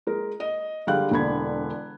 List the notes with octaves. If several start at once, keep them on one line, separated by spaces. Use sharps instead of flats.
G#3 A#4
D#5
D3 G3 G#3 F5 G5 F#6
E1 D3 B5 G#6